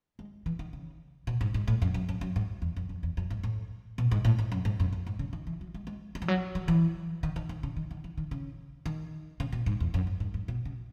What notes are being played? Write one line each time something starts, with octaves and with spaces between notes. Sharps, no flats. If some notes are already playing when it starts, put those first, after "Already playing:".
G#3
E3
D#3
C#3
B2
G#2
G#2
A2
F#2
F#2
F#2
F#2
G#2
E2
F#2
F#2
E2
F#2
G#2
A2
B2
G#2
A2
G#2
F#2
G#2
F#2
E2
G#2
C#3
D#3
E3
F#3
G#3
G#3
G#3
E3
F#3
F#3
E3
D#3
D#3
D#3
C#3
D#3
D#3
E3
D#3
C#3
D#3
C#3
B2
G#2
E2
F#2
G#2
G#2
G#2
B2
C#3